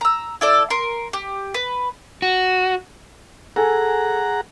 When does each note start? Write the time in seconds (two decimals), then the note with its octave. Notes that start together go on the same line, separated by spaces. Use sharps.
0.01 A#5 E6
0.41 E4 A4 D5
0.70 A#4 C6
1.13 G4
1.54 B4
2.22 F#4
3.56 G#4 A4 F#5 G#5 A#5